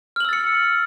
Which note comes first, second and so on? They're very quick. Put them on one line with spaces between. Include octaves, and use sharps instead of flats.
F6 F#7 E6 A6 C#7